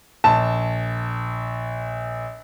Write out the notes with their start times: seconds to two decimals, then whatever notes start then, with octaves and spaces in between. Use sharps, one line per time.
0.24 A#1 A5